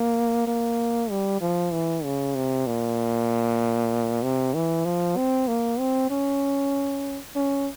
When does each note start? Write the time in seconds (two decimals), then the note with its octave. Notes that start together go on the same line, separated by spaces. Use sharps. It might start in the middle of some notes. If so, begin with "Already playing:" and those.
Already playing: A#3
0.47 A#3
1.10 G3
1.41 F3
1.72 E3
2.04 C#3
2.35 C3
2.67 A#2
4.22 C3
4.54 E3
4.85 F3
5.16 C4
5.48 A#3
5.79 C4
6.10 C#4
7.36 C#4